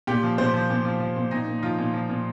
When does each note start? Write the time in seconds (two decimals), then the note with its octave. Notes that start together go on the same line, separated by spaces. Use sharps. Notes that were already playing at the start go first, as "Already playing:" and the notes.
0.07 A#2 G4
0.23 F3
0.38 A#2 C5
0.54 F3
0.70 A#2
0.85 F3
1.00 F3
1.16 A#2
1.31 A#2 D#4
1.47 A#2
1.58 D#4
1.63 F3 F4
1.78 A#2
1.94 F3
2.09 A#2